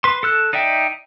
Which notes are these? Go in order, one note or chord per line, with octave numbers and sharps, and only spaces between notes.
B4 C6
A4 E6 F#6
D#4 D5 E5 G5